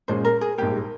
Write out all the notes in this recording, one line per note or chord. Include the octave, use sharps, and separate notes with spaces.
A#2 G#3 C#4 G#4 C5
A#4
G#4
A#1 G#2 G3 A#3 G4